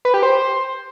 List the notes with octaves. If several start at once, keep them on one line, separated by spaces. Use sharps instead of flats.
B4
G4
C5